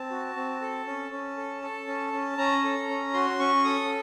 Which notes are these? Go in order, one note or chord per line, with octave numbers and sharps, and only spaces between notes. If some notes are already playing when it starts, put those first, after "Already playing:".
Already playing: C4 A5
F#4
C4
A4
C#4
C#4
A4
A4
C#4
C#4
C#4 A#5
A4
C#4
F#4 C6
C#4 C#6
A4 D#6